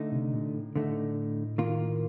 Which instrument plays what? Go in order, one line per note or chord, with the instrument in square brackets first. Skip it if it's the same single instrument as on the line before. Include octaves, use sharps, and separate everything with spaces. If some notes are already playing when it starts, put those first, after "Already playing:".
Already playing: [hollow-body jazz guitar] D3 A3 D#4
[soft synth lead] C3
A#2
A2
[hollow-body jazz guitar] D3 A3 D#4
D#3 A#3 F4